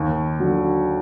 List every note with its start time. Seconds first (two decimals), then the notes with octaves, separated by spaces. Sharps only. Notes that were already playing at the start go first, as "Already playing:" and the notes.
Already playing: D#2
0.40 D3 F#3